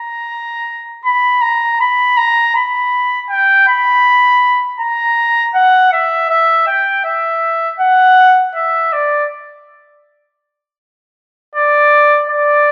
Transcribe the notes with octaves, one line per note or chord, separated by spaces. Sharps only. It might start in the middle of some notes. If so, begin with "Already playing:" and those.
Already playing: A#5
B5
A#5
B5
A#5
B5
G5
B5
A#5
F#5
E5
E5
G5
E5
F#5
E5
D5
D5
D5